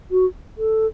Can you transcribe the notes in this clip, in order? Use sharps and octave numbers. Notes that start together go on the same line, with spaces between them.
F#4
A4